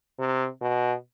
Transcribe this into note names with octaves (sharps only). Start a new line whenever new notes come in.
C3
B2